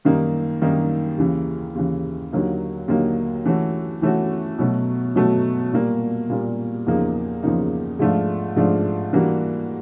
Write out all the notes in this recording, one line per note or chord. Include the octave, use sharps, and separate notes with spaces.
F#2 D#3 G3 A#3 D#4
F#2 D#3 G3 A#3 D#4
D#2 C#3 E3
D#2 C#3 E3
D#2 D3 F#3 A#3 D#4
D#2 D3 F#3 A#3 D#4
E3 A3 C#4 F#4
E3 A3 C#4 F#4
B2 F#3 A3
B2 F#3 A3
A#2 G3 A#3
A#2 G3 A#3
E2 C#3 F3 A#3 D#4
E2 C#3 F3 A#3 D#4
G#2 F3 A3 D4 F4
G#2 F3 A3 D4 F4
E3 G3 A#3 D4 F#4